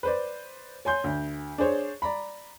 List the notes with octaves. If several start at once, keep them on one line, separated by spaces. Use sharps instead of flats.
B4 C5 D5
C#5 G#5 C6 G6
D2
D4 G#4 C5 C#5
D5 A#5 B5